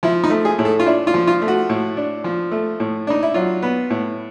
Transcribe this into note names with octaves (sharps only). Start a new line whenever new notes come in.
F3 E4
D#4
A3
G#4
A2
A4
F4
D4 E4
F4
F3
F4
A3
F#4
A2
D4
F3
A3
A2
D4 D#4
E4
F#3 F4
B3
A2